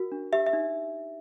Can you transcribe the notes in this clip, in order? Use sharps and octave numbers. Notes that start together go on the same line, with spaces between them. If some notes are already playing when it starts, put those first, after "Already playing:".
Already playing: F#4 A#4
D4
G4 E5
E5
D#4